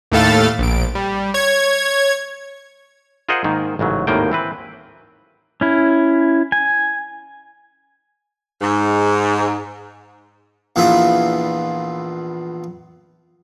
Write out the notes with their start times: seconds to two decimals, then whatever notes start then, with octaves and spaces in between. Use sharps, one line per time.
0.12 D#2 A2 A3 A4 F5 A6
0.59 A#1 D7
0.95 G3
1.34 C#5 G#6
3.29 F4 G#4 A#4 C5 D#5 F#5
3.44 G#2 D#3 A#3
3.79 A1 G#2 C#3 F#3
4.07 G#1 D#2 A2 D#3 A#3 G5
4.32 E3 C4 B4
5.61 C#4 E4
6.52 G#5
8.61 G#2
10.76 A#1 E2 A#2 E3 F4 E5